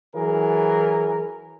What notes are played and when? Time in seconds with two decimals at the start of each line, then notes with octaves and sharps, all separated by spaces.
0.15 E3 F#3 G#4 A#4